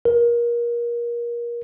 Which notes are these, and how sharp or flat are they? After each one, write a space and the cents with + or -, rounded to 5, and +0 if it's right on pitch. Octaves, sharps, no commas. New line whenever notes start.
A#4 +25